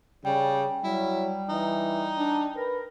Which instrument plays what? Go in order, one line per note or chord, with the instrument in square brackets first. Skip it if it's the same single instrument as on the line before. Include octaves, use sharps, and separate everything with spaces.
[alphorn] C#3 [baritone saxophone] G3 [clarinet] D5 [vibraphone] G5
[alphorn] F#3 [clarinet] G3 [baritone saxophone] E4
[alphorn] E3 [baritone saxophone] D#4
[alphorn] D4
[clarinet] A#4 [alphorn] B4